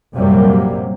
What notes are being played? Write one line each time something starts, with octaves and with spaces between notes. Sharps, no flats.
A#1 F#2 C3 F#3 G3 A#3